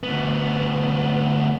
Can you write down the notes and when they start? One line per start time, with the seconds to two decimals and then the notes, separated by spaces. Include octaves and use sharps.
0.03 D2 B3